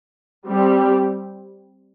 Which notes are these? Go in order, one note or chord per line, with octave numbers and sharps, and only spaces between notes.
G3 C4 G4